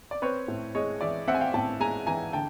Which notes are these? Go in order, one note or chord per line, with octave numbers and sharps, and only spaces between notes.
D5
C4 B4 C#5
A2
G#3 C#5 D#5
E3 D5 E5
C4 E5 F#5
G#5
F5 G5
A2 G5 A5
G#3 G#5 A#5
E3 G#5 A#5
D3 G5 A5